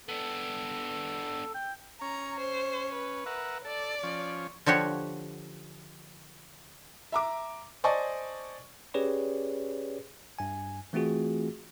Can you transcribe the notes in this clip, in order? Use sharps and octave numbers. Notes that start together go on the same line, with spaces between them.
B3 D4 A4
G5
C#4 A#5
C5
B4
A#4 E5 F#5
A4 D5
F3 C#4
D3 F3 F#4 G4 C#5
E5 A#5 D6
C5 D5 D#5 G#5 A5 C#6
C#4 G4 G#4 B4 C#5 D5
G2 G#5
E3 A3 C4 F4 F#4 G#4